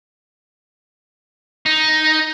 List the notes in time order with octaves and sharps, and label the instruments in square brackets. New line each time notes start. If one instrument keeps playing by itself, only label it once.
[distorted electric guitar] D#4